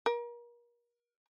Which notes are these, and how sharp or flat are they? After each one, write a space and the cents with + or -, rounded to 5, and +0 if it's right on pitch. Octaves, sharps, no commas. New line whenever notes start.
A#4 +35